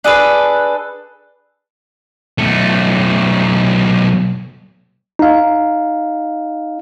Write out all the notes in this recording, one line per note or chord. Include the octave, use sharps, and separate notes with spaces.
D4 G#4 A4 B4
B1 A3
D#4 F5